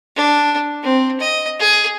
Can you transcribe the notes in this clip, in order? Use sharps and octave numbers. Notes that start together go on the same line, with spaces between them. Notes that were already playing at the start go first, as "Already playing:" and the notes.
D4
C4
D#5
G#4